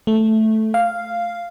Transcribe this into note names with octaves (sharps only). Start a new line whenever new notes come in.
A3
F5